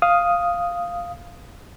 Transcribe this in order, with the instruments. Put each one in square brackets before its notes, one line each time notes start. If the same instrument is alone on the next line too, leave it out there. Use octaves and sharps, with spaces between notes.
[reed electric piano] F5 D#6